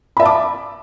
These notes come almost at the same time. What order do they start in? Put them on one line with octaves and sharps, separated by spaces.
B5 E5 A5 D6